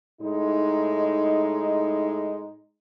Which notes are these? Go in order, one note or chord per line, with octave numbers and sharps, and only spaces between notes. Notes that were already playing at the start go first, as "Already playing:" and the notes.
A2 G#3 D#4